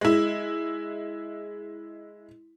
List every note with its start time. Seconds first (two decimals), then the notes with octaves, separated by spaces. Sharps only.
0.01 G#3 E4